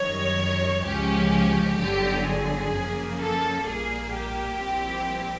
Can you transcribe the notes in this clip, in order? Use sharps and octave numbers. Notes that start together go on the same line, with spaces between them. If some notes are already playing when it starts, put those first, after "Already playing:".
Already playing: F#2 D#3 G3 C#5
C#2 C#3 F3 G#3 C#4 G4
G1 G2 D3 F#3 G4
G#4
F#2 C#3 F3 A#3
A4
A#1 A#2 G3 A#3 G#4
G4
A#1 A#2 G3 C4 E4